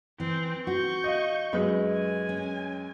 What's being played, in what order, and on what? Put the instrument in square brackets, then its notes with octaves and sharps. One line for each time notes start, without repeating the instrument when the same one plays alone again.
[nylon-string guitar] E3 [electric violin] C4
[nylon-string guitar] F#4 [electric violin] C#6 G6
[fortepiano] D#5 F5
[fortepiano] F#2 G#3 [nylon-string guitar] B4
[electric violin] G#5
[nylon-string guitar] C#4